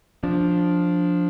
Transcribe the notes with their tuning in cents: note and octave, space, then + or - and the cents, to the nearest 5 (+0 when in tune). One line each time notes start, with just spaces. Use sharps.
F3 +10 D4 -5